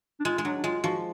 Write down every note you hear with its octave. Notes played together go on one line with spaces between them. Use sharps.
D4
G#3 F4
G#3
F#3 D4
D4
G#3 F4
F3 F#4